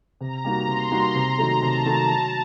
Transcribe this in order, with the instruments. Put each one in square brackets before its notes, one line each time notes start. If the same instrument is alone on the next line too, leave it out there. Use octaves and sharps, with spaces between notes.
[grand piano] C3 [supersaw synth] A#5
[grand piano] G3 A#3 D#4 F#4
[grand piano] C3 [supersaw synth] C6
[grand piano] G3 A#3 D#4 F#4
[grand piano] C3 [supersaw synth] A#5
[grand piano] D#3 F#3 A3
[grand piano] C3 [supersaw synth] A5
[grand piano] D#3 F#3 A3
[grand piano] F#3 [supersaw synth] A5